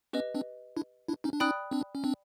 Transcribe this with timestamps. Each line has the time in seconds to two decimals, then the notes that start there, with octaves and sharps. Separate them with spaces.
0.13 B3 C#4 G4 B4 D#5
0.35 C4 D4
0.77 D4 E4
1.08 D4 E4
1.24 C#4 D#4
1.33 D4
1.40 C#4 D#4 D5 G5 B5 D#6 F#6
1.71 C4 D4
1.95 C#4
2.04 C4 D4